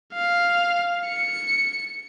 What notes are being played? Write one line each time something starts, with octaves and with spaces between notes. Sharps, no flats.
F5
C#7